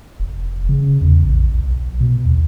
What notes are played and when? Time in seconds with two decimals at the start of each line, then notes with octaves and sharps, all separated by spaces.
0.20 F1
0.69 C#3
1.01 E2
1.24 A#1
1.54 B1
2.00 B2
2.25 D#2